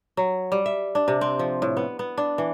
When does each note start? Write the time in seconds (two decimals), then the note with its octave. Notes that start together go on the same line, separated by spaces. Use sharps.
0.17 F#3
0.52 G3
0.66 E5
0.95 D4
1.08 C3
1.21 C4
1.39 F3
1.62 A2
1.77 B3
1.99 B3
2.18 D4
2.38 E3